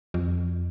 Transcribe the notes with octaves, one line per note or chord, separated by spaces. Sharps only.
F2